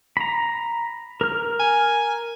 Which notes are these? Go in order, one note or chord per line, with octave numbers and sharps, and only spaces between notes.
A#5 B5
A#4 F6
G#5